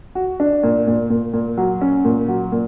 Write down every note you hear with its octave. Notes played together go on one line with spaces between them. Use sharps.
F#4
D4
A#2
A#2
A#2
A#2
F#3
C#4
A#2
F#3
A#2